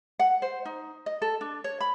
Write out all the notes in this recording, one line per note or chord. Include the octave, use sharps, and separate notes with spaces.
F#5
C5
D#4
D#5
A4
D4
C#5
B5